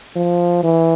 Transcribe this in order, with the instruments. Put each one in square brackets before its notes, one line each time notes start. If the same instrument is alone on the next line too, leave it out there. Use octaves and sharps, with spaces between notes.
[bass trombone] F3
E3